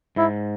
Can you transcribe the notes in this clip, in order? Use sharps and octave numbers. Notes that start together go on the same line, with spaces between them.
G#2 E4